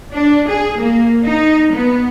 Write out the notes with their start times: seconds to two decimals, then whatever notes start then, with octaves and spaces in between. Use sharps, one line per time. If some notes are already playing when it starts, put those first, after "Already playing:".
0.12 D4
0.47 G#4
0.79 A#3
1.24 D#4
1.72 B3